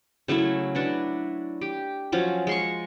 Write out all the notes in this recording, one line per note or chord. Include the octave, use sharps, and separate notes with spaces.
C#3 F#3 A3 E4
D4 F#4 B4
G4
F3 F#3 C#4
G#3 C6 C#6